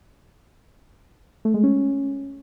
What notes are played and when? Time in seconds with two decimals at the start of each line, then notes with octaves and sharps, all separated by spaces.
1.45 A3
1.54 G#3
1.63 C#4